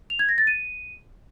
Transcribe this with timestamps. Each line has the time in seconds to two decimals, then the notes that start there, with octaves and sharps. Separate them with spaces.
0.10 F7
0.19 G#6
0.29 A#6
0.38 A6
0.47 D#7